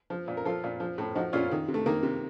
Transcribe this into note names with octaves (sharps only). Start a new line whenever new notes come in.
F3
A#2
A#4
F3 F4 A4
A#2
F3
A2
F3 D#4 F#4
A#2 C#4 F4
D#3
C3
A3
D#3 A#3
C3